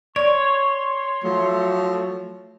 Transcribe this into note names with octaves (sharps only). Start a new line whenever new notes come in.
C#5 D5 C6
F3 F#3 A3